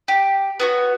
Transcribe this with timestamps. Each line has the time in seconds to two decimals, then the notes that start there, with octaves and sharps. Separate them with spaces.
0.08 G4
0.60 B3 F#4 C#5